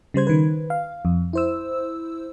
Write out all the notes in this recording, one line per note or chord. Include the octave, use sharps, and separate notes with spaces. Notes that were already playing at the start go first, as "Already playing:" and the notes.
C#3 G3 C5 G#6
D#3 B4
F5
F2
E4 C5 E6